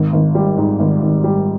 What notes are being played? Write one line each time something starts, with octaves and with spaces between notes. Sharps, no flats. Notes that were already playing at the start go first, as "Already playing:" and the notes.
Already playing: G#1
G#1
G3
G#2
G#1
G#1
G3